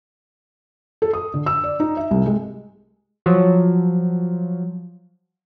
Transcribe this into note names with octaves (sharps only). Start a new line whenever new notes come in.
A4
D#6
D3
E6
D5
D#4
E5
C2
G#3
F3 F#3